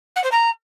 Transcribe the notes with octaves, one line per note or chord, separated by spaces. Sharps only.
F#5
C5
A#5